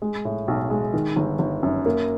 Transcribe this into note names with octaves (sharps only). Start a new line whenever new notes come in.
G#3
A2
B1
G#3
D#3
G1
G1
F#2
A#3